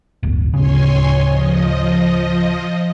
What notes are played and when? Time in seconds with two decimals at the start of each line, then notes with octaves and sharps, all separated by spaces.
0.23 D1 G1
0.54 D1 C#3 C#5 G#5 C6
1.23 F3 D#5